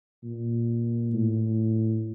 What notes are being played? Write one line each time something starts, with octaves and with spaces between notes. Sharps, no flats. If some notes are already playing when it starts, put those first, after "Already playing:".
A#2
A2